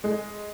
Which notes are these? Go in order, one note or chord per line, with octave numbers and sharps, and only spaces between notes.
G#3